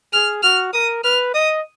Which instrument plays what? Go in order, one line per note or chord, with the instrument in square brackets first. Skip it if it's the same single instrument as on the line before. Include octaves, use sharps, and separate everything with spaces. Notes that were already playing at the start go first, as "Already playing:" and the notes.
[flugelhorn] G#4 [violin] F6
[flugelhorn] F#4 [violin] F6
[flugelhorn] A#4 [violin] D#6
[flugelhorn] B4 [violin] F6
[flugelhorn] D#5 [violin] D#6